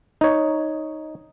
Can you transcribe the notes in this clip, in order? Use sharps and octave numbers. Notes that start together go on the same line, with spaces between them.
D#4 C#5